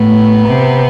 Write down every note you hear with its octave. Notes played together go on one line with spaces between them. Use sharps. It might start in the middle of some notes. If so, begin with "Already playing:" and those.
Already playing: A2 B3
C3